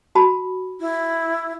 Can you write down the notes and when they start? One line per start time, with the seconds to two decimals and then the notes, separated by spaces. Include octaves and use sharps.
0.15 F#4 A5 B5
0.80 E4